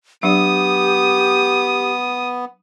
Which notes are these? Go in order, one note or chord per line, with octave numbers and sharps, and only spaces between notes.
F#3 B3 D4 G4 D5 D#6